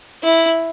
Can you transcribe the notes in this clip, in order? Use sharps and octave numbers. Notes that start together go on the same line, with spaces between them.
E4